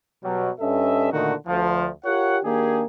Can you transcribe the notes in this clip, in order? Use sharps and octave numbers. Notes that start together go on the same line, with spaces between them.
B2 F#3 G3
G2 C#4 A4 D#5 E5
A#2 D3 D#3 A3 D#4 F#4
D2 F3
F4 G4 A#4 C#5 F#5
D#3 A#3 D4 G4 G#4